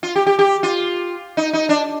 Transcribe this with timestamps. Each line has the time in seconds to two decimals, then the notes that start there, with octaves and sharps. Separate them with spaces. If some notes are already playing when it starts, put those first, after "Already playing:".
0.03 F4
0.16 G4
0.26 G4
0.39 G4
0.63 F4
1.37 D#4
1.53 D#4
1.69 D4